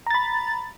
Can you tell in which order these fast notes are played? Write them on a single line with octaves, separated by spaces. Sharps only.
A#5 A6 B5